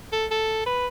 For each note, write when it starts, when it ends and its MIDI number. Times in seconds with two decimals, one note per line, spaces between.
0.12 0.26 69
0.31 0.63 69
0.66 0.87 71